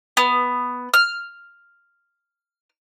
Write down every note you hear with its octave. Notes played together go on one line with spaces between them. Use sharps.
B3
F6